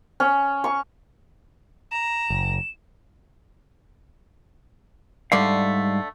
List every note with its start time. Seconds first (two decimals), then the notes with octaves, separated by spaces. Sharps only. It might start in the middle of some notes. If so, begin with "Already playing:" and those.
0.20 C#4
0.64 C#6
1.91 A#5 E7
2.30 F#1
5.32 G#2 D3 G3 A3 D5 F5